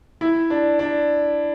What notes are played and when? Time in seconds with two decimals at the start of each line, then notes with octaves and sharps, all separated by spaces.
0.21 E4
0.50 D4
0.79 D4